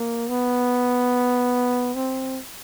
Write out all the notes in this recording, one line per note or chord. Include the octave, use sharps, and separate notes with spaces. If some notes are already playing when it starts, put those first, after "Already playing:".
Already playing: A#3
B3
C4